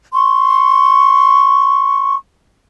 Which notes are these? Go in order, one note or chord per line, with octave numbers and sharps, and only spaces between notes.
C6 C#6